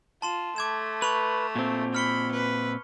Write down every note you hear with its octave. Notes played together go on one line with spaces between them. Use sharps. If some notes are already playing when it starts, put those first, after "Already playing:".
F4 A5 C6 E7
A3 D6 G#6 E7
B4 C#6 F7
A#2 C4
B5 F6 C#7 G7
B4